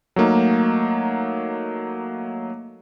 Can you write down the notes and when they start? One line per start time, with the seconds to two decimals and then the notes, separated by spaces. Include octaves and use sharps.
0.16 F#3 A3 A#3 D#4